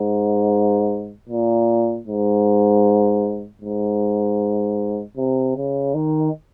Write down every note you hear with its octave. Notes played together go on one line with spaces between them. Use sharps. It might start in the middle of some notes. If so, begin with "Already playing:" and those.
Already playing: G#2
A#2
G#2
G#2
C3
C#3
D#3